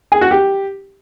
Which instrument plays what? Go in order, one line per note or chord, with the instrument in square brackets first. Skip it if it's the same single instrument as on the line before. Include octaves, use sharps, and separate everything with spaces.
[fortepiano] G#4
F#4
G4